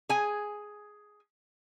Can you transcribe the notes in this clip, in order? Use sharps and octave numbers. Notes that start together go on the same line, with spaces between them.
G#4 G#5